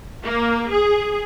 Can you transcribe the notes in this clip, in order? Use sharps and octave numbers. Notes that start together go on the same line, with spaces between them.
A#3
G#4